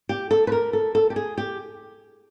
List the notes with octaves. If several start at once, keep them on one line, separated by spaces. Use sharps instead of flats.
G4
A4
B4
A#4
A4
A4
G4
G#4
G4